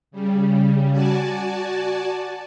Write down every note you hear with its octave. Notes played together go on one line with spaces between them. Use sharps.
C#3 G3
F#4 D5 G#5 A5